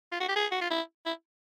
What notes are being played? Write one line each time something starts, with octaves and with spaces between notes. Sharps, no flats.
F4
F#4
G4
G#4
F#4
F4
E4
E4